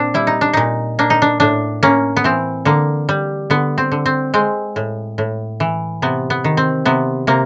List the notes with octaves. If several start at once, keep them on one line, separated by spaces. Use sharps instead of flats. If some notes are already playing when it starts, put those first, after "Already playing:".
Already playing: A#2 C4 D4
G3 E4
D#4
D4
A#2 D#4
A#3 D4
D#4
D4
A2 D4
A#3 C#4
B3
E3 C4
D3 A#3
G3
D3 B3
C4
D3
C4
G#3 C4
A2
A2
E3
C3 B3
B3
D#3
C4
C3 B3
C3 A#3